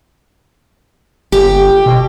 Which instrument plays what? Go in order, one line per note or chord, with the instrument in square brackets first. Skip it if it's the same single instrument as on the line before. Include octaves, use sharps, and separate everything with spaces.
[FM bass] G1 [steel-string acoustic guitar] G4
[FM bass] B2